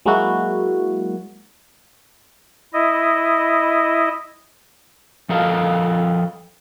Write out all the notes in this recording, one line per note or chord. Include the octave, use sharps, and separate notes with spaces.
F#3 G#3 A#3 E4 F#4
E4 D#5
F3 A4 A#4 D#5 F5